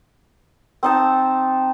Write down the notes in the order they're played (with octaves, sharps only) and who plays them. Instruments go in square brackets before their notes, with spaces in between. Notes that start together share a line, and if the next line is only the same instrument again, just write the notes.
[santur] C4 D#4 A5